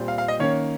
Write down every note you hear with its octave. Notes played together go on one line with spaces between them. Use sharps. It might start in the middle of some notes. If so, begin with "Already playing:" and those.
Already playing: A#2 G3 C4
F5
F5
D#5
D#3 A#3 C#4 C#5